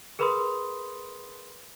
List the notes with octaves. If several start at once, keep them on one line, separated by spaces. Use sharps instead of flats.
G#4 A#4 B4 B5 C6 D#6